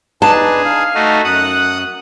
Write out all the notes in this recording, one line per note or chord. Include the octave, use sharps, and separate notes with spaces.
D4 D#4 G#4 B4 A5
F5 F6
A3 D#4 F#4
F#2 F#5 D#6 F#6